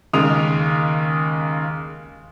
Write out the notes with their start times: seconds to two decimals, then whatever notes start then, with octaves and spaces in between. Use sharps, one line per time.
0.13 D#2 C#3 G#3 D#6 F7